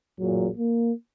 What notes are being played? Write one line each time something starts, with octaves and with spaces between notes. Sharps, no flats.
A1 F#2 A#2 F#3 G#4
A#3